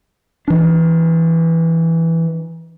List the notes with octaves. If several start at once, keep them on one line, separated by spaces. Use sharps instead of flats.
E3 D4